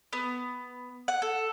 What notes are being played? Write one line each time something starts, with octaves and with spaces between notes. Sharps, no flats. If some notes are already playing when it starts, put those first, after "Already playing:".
B3
F#5
A4